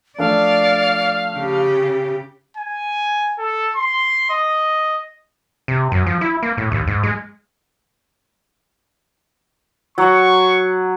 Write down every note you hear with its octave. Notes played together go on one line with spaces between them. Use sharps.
F3 A3 D4 D5 F5
C#3 G4
G#5
A4
C6
D#5
C3
F#2
F3
E4
A#3
A2
D#2
G#2
G#3
F#3 C#6